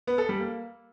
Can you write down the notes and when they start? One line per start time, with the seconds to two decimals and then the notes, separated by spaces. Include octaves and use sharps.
0.07 B3
0.18 A4
0.29 G3
0.40 A#3